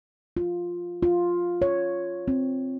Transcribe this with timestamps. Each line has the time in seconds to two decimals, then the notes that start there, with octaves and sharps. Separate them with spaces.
0.37 F4
1.03 F4
1.62 C#5
2.28 C4